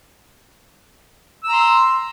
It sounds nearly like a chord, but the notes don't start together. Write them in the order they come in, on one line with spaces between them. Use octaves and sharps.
E6 A#5 C6